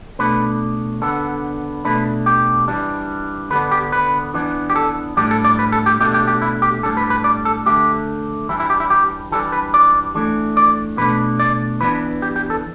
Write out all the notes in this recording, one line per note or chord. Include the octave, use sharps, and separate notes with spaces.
B2 A3 D4 B4
D3 B3 D4 A4
B2 A3 D4 B4
G4
E3 G3 D4
D3 B3 D4 B4
G4
B4
E3 B3 D4
G4
A4
A2 G3 D4 G4
A4
D5
B4
A4
G4
B2 A3 D4 G4
G4
G4
E4
G4
A2 G3 D4 A4
B4
B4
D5
A4
D3 A3 D4 G4
E3 G3 D4 E4
E4
G4
E4
G4
E3 G3 B3 D4 A4
B4
D5
E3 A3 D4
D5
B2 A3 D4 B4
D5
E3 B3 D4 B4
G4
G4
A4